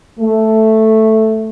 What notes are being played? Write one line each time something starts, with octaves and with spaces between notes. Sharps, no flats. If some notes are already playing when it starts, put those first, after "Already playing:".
A3